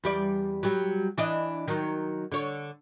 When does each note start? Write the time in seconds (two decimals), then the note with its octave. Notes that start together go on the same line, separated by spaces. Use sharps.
0.04 E2 G3 D5
0.63 F#3 G3
1.18 E3 D4 D#5
1.68 D#3 F#3
2.32 D3 C#5